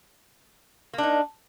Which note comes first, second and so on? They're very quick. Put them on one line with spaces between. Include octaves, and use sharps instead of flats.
A#3 D4 D#4